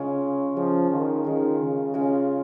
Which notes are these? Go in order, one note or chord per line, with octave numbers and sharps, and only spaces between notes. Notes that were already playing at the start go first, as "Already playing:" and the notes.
Already playing: C#3 G#3 C#4 F4
F3 G#3 C#4 F4
D#3
D#3 G#3 C#4 F4
C#3
G#3 C#4 F4